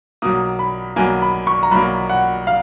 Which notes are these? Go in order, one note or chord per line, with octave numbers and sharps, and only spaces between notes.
B1 B2 A#3 D#6
B5
B1 B2 A#3 G#5
B5
C#6
A#5
B1 B2 A#3 B5
F#5
F5